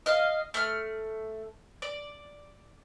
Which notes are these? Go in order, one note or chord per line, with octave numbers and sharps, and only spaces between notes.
D#5 F5
A3 F6
D5